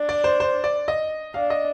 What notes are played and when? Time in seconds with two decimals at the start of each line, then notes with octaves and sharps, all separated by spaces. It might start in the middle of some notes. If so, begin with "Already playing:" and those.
Already playing: D4
0.09 D5
0.24 C5
0.40 C5
0.64 D5
0.88 D#5
1.34 D4 F5
1.50 D#5